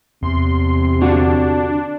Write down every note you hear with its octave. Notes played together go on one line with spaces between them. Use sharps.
E2 C3 C6
D3 D4 F4 F#4